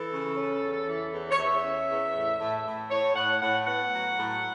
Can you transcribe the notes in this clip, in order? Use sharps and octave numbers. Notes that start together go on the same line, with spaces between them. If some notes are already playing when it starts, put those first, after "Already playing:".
Already playing: E3 A4
C#3
C#4
E2
E3
E2
C#5
E2 E5
C#4
E2
A2
A2
A2
A2 C#5
A2 F#5
A2 F#5
B3 F#5
F#3
A2